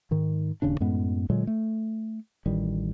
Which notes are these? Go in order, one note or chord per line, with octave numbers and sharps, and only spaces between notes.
G#2 D#3
D#1 D#2 C#3 D4
F#2 A2 G#3 B3
A#2 D3 F#3 G#3
A3
A1 D#3 G3